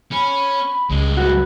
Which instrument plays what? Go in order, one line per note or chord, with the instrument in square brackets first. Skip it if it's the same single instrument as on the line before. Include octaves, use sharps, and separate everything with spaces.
[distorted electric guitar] C#4 [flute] B5
[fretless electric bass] C#2 [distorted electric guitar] G2 G#3
[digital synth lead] F#4 [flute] B4